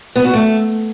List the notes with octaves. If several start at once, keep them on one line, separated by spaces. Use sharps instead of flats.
B3
F#4
A3